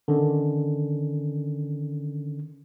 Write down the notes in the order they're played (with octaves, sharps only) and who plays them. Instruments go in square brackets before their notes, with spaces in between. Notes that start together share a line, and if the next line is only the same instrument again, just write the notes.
[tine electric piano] D3 D#3 C#4